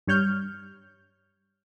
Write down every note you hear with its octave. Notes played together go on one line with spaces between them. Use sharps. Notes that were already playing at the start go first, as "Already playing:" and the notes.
G2 G3 C#5 F6 G6